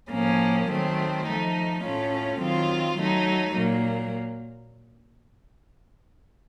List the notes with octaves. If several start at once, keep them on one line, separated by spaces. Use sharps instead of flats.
A2 F3 A#3 C#4
D#3 F#3 A3 C4
F3 A3 D#4
A2 A3 C#4 F4 A4
D#3 F#3 C4 F4
F#3 A3 D#4
A#2 F#3 A#3